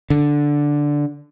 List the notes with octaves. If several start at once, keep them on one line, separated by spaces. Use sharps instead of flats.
D3